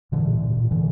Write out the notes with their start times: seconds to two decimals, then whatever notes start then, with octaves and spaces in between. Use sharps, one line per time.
0.12 A#2 D3 E3
0.27 A#2
0.43 A#2
0.57 A#2
0.71 A#2 D3 E3